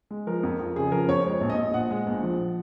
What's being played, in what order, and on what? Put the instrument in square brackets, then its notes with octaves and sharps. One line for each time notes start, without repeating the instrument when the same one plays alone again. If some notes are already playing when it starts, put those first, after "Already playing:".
[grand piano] G#3
F3 A#4
F2
F2
C#3 G#4
F3 A#4
F2 C#5
G#3 C#5
A#1
D#5
A#1
A#2 F#5
G#3
A#1
F3